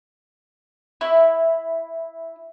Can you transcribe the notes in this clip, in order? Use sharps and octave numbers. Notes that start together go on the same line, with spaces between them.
E4